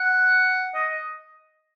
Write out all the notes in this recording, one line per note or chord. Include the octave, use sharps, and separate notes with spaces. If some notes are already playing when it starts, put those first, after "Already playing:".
Already playing: F#5
D#5